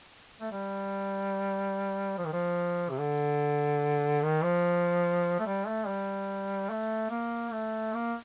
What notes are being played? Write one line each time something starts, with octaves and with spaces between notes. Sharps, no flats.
A3
G3
F3
D#3
F3
C3
D3
D#3
F3
A3
G3
A3
G3
A3
A#3
A3
A#3